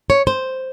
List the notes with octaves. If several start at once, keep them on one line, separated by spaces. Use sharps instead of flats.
C#5
C5